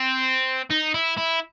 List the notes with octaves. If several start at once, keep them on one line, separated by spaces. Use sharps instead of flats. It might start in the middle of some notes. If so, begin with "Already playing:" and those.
Already playing: C4
D#4
E4
E4